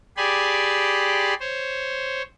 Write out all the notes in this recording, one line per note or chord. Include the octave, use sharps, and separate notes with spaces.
G4 G#4 D5 G#5 B5 C6
C5 C#5